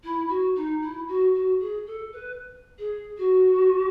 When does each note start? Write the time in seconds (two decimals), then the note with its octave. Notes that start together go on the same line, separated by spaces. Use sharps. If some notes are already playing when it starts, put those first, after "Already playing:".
0.03 E4
0.29 F#4
0.55 D#4
0.81 E4
1.08 F#4
1.34 F#4
1.60 G#4
1.86 A4
2.12 B4
2.79 G#4
3.18 F#4